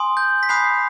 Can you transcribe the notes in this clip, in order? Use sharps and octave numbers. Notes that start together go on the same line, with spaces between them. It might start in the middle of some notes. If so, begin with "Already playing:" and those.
Already playing: G#5 C6 D#6
G6
B6
G#5 B5 D#6 F#6 C7
C7